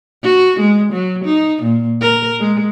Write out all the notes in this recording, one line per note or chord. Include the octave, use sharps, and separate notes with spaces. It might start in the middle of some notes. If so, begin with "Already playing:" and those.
F#4
G#3
F#3
D#4
A#2
A#4
G#3